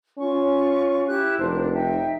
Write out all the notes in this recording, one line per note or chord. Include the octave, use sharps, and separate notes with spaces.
C#4 F4 C#6
E4 G4 F#6
F1 D4 A#4 C5
D#4 E5 G5